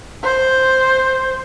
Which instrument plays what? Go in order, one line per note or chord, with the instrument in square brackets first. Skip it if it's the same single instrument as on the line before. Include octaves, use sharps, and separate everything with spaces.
[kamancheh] C5